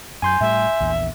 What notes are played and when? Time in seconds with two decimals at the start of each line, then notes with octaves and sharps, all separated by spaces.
0.22 F#2 G#5 C6 G6
0.41 A2 G3 E5
0.80 A#1 E2